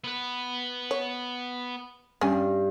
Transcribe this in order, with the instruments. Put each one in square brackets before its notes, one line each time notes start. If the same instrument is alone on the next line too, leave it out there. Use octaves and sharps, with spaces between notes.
[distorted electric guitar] B3 B4
[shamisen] C#5
[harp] G2 [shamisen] C#4 G#5